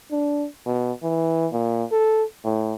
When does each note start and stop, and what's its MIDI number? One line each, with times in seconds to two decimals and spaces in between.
0.12 0.47 62
0.66 0.92 47
1.03 1.47 52
1.52 1.84 46
1.91 2.24 69
2.44 2.74 45